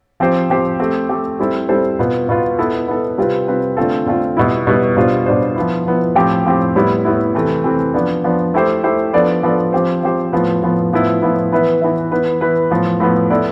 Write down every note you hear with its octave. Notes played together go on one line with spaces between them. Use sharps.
F3 C4 G4 C5
F3 C4 G4 C5
A3 C4 G4
A3 C4 G4
G3 C4 E4 A4 C5
G3 C4 E4 A4 C5
B2 B3 F4
B2 B3 F4
B3 E4 A4
B3 E4 A4
C3 G3 C4 F4 B4
C3 G3 C4 F4 B4
D3 A3 C4 F4 A4
D3 A3 C4 F4 A4
B2 G3 B3 E4
B2 G3 B3 E4
B2 G3 D4 F4 C5
B2 G3 D4 F4 C5
F3 B3 E4
F3 B3 E4
A2 F3 C4 G4
A2 F3 C4 G4
A2 G3 B3 E4
A2 G3 B3 E4
C3 E3 A3 C4
C3 E3 A3 C4
F3 B3 D4
F3 B3 D4
A3 E4 G4 C5
A3 E4 G4 C5
F3 B3 D4 A4 D5
F3 B3 D4 A4 D5
F3 C4 G4 C5
F3 C4 G4 C5
A2 F3 B3
A2 F3 B3
A2 F3 B3 E4
A2 F3 B3 E4
E3 B3 E4 B4 E5
E3 B3 E4 B4 E5
E3 B3 E4 B4
E3 B3 E4 B4
A2 F3 B3
A2 F3 B3
B3 E4 A4 D5